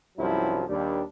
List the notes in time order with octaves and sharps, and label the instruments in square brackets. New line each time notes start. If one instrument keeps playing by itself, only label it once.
[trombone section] C2 G2 F3 F#3 C#4 E4
D#2 G3 D4